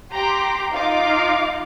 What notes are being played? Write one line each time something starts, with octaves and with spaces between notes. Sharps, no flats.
G4 G5 A#5 C6 D6
D#4 F4 F5 D6